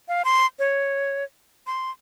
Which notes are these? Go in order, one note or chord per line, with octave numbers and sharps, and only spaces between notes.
F5
C6
C#5
C6